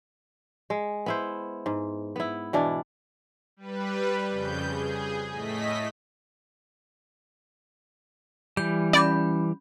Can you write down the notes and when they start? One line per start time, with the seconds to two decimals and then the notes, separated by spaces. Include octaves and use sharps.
0.70 G#3
1.06 B3 E4 C5
1.66 G#2
2.16 B3 E4
2.53 B2 E3 D4
3.57 G3 B4
4.29 F2 C#3 G6
4.64 G#4
5.31 A2 A3 D#5 B6
8.57 E3 G3 G6
8.93 C#4 D5 B5 G6